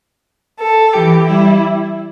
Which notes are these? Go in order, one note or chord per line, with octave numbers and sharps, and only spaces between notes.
A4
E3 G4
G3 E4